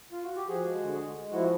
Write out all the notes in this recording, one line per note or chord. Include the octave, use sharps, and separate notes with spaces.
F4
F#4
G4
F3 F#4 G#4
G#3
D3
G#3
G#3
F3 E4 F#4